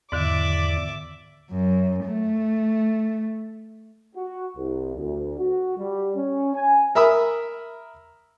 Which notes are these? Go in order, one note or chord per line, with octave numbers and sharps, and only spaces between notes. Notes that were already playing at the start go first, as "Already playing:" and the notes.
E2 G#2 D3 D#3 D5 E5 D6
F#2
A3
F#4
C2
D2
F#4
G3
C#4
G#5
A#4 E5 B5 D#6 E6